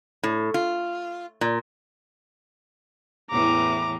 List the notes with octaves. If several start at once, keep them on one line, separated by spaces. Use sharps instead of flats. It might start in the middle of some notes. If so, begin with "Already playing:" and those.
A2
F4
A#2
E2 A2 E3 A#5 D6